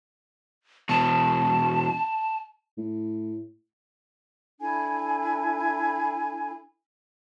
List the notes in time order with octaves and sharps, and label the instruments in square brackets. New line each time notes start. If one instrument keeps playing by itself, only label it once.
[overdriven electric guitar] E2 B2 [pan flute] A5
[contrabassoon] A2
[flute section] D4 E4 A4 G#5